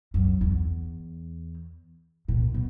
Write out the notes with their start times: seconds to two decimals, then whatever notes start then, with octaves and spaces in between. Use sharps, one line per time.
0.14 F#2
0.41 E2
2.28 A#2
2.54 B2